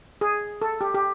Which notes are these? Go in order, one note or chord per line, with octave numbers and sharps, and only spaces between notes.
G#4
A4
G4
G4